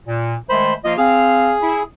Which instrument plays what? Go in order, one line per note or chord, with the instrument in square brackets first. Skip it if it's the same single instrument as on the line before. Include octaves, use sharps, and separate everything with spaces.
[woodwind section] A#2
[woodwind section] D#3 G#3 A3 [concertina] C5 B5
[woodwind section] F3 A#3 F4 [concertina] D#5
[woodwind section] C4 F5 [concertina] G#4
[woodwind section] E4